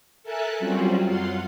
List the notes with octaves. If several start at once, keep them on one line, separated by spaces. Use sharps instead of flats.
A4 A#4 E5 G#5 A5 F#6
F#3 G3 C4 C#4 F4 F#4
F#2 F4 F5 F#5 C6